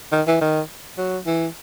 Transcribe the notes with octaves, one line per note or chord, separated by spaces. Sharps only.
D#3
E3
D#3
F#3
E3